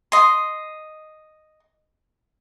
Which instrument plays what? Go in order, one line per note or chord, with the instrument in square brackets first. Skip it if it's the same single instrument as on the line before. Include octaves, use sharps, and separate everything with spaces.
[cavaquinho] D#5 C6